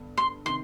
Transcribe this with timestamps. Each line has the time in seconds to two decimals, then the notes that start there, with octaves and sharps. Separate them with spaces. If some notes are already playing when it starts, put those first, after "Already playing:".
Already playing: G2 D3 B3
0.18 C6
0.45 C3 D#3 C6